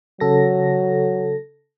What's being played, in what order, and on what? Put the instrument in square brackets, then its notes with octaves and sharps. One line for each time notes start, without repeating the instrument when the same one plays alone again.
[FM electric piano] C#3 A4 A#6 [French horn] F#3